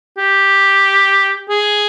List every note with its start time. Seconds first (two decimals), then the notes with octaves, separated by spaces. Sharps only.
0.17 G4
1.49 G#4